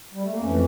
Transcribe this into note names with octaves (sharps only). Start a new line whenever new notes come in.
G3
A3
A#3
F2 E3 A3 C#4